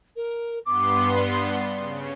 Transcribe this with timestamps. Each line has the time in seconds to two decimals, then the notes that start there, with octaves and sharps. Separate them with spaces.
0.16 A#4
0.65 G2 B3 C6 D6
1.16 D5
1.76 C#3